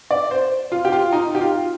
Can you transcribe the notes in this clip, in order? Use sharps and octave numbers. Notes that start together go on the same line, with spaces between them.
D5
C5
F4
G4
F4
D#4
G4
F4